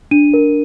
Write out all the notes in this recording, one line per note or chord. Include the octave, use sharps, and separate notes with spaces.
D4 D#7
A#4